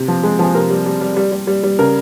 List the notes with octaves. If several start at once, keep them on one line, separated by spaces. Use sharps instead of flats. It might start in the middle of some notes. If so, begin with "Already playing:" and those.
Already playing: C3
F3
G#3
F3 G#4
C3 A#4
G3
G3
G3
G3
G3
G3
G3
C#3 A#4